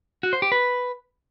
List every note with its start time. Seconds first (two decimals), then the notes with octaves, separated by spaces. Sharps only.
0.23 F#4
0.33 C5
0.42 G4
0.52 B4